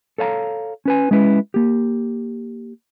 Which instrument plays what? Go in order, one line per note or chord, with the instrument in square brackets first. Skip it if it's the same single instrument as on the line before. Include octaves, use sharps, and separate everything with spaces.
[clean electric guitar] A4 C#5 F5 A5 A#5
C#4 B4 G#5
G#3 C#4 E4 B4
A#3 G4